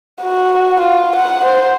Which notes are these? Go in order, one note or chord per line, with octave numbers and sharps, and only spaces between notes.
F#4
F4
F#5
C5